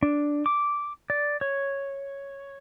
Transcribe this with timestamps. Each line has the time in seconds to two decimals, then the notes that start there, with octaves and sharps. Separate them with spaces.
0.03 D4
0.46 D6
1.10 D5
1.41 C#5